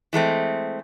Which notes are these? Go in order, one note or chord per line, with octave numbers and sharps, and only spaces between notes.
E3 G#3 A3 C4